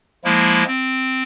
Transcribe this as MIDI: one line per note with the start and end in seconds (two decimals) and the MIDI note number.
0.25 0.64 53
0.25 0.64 56
0.25 0.64 58
0.25 0.64 64
0.67 1.23 60